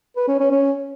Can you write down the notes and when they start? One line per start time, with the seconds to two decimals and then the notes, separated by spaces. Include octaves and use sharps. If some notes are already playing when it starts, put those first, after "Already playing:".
0.16 B4
0.28 C#4
0.39 C#4
0.51 C#4